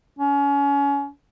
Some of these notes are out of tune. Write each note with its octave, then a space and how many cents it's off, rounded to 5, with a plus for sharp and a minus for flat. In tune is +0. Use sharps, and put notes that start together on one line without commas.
C#4 +30